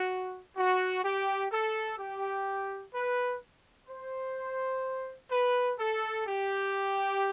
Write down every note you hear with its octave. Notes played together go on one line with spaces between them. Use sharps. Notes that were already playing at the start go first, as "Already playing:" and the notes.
Already playing: F#4
F#4
G4
A4
G4
B4
C5
B4
A4
G4